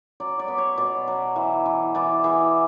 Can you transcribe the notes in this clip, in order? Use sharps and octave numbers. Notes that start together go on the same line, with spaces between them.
F#3 D5
D5
B3
C#5
B2 D5
F#3
E3
E3
E3 D5
E3 G#4